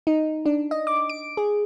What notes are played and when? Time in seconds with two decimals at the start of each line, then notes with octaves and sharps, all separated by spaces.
0.07 D#4
0.46 D4
0.71 D#5
0.87 D6
1.09 D7
1.37 G#4